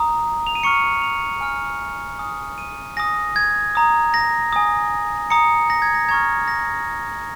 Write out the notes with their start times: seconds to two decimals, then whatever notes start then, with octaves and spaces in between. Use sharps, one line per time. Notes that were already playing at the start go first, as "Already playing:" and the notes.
Already playing: A#5 D#6
0.47 F7
0.55 D#7
0.63 A#5 C#6 F6 C#7
1.02 F7
1.41 G#5 F6
2.19 G#5 D#6
2.58 D#7
2.97 G#5 D#6 A#6
3.36 G#6
3.75 A#5 D#6
4.14 A#6
4.53 G#5 D#6
5.30 A#5 D#6 C#7
5.70 A#6
5.82 G#6
5.95 A#6
6.09 A#5 C#6 F6 G#6
6.48 A#6